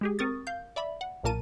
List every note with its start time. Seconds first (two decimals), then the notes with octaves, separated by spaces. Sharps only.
0.01 G#3 G4 G#4
0.19 C4 A#4 C#6 D#6 A6
0.47 F5 G6
0.76 D5 E5 B5
1.01 F#5
1.24 B1 A#2 A#3 A#4 A5 D#7